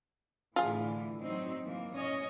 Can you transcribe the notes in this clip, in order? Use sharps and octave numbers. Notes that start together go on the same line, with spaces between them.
A2 D3 E3 F4 G#4
F#3 C4 D#4
E3 A#3
C#4 C#5 D#5